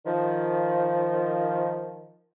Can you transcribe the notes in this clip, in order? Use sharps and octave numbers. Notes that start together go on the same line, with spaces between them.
D#3 F3